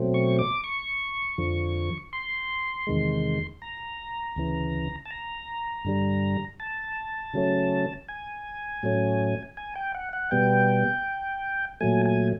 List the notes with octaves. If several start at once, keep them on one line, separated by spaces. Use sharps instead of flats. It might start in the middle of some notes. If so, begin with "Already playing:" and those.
Already playing: B2 F#3 A3 C4
C#6
D6
C#6
F2 D3 F3
C6
E2 C3 D#3 G#3
A#5
D2 C#3 E3
A5
A#5
G2 D3 G3
A5
C#3 F#3 A3 C#4
G#5
A2 F#3 A3 C#4
G#5
G5
F#5
F#5
B2 G3 B3 G5
A#2 F#3 A3 G#5
G#5